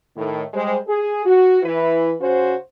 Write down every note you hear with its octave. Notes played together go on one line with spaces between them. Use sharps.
A2 D#3
G3 G#3 C5
G#4
F#4
E3 E4 B4
C#3 C#4 F#4 C5